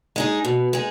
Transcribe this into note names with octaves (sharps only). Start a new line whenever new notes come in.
G#3 D#4 G#4
B2
G#3 D#4 G#4